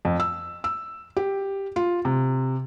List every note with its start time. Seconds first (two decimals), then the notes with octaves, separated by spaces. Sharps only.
0.05 F2
0.20 E6
0.64 E6
1.17 G4
1.76 F4
2.05 C3